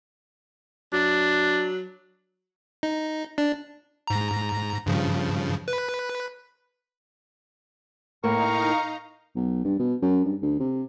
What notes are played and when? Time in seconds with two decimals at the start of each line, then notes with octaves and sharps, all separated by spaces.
0.93 F#3 D4
2.83 D#4
3.38 D4
4.07 G#2 A#5
4.86 G2 C#3 F3
5.68 B4
8.24 A2 A#3 D#4 A#4 F5 A#5 C#6
9.36 B1
9.64 G2
9.79 B2
10.02 F#2
10.25 G2
10.42 D2
10.60 C3